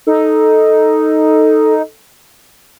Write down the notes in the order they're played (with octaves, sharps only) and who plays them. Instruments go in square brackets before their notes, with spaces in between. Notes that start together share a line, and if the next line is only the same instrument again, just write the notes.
[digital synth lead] D#4 [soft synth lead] A4